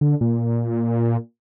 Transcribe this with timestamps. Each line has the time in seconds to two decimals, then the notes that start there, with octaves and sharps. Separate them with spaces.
0.01 D3
0.21 A#2